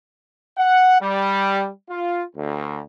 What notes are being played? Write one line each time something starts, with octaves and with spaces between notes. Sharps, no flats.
F#5
G3
F4
D2